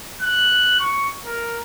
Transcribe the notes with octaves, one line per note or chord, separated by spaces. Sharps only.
F#6
C#6
A#4